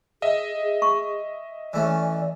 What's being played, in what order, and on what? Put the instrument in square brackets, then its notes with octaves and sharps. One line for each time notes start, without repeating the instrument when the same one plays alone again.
[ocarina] G#4 [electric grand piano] D#5 E5
[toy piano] C#6
[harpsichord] E3 A3 C#4 [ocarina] D5